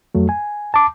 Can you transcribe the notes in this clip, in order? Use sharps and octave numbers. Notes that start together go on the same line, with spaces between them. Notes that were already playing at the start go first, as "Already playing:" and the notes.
F2 F#3 A3
G#5
A5 D6